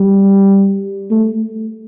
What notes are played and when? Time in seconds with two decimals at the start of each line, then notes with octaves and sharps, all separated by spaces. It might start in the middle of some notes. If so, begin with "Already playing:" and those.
Already playing: G3
1.11 A3